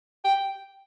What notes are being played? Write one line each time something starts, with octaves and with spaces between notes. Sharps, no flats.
G5